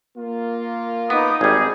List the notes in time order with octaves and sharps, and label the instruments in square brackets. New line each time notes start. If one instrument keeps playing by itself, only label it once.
[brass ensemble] A#3 F4
[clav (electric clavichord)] B3 [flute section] D#4 [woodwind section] B4 D6 D#6
[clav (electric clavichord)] G#1 G3 [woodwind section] G#4